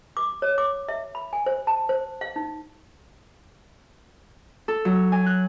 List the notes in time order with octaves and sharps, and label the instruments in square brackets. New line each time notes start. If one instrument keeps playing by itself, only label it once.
[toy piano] D6
C#5
D6
E5
B5
G#5
C5
A5
C5
F5
D#4
[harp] A4
F#3
G#5
F#6